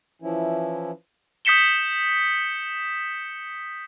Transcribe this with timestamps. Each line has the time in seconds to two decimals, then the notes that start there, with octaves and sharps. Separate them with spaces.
0.22 E3 F3 C#4 E4
1.45 D#6 G6 B6 C#7 E7 G7